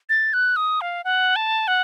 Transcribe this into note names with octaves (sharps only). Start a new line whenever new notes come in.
A6
F#6
D#6
F5
F#5
A5
F#5